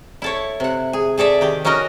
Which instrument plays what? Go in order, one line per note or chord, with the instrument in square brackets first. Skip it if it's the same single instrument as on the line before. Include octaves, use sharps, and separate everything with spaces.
[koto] E4 A4 C#5
C3 F#5
G#4
G#4 A4 D5 E5
D#3 G4
C#4 D#4 F#4 A#4 D#5